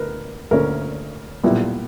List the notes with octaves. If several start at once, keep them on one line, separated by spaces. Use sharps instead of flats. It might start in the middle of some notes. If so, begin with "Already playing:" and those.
Already playing: D2 A#4 B4
D2 D3 A#3 C#4 A#4
B1 A#2 G3 B3 E4